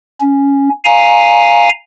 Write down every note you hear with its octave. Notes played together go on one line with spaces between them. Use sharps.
C#4
F5 G#5 A#5